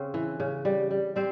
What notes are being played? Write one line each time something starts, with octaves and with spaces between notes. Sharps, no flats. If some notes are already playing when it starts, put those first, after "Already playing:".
Already playing: C#3 C4
E3
C#3
G3
G3
G3 C4 C5